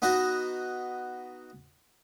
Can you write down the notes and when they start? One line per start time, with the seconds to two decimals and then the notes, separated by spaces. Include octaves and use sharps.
0.02 B3 D#4 F#4 A#5